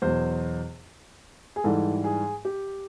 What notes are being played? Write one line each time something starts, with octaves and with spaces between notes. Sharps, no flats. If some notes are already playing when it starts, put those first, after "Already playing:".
E2 B2 F#3 C5
G#4
G#2 E3 G3 A4
G#4
G4